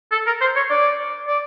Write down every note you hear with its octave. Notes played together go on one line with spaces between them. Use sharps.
A4
A#4
C5
C#5
D5
D5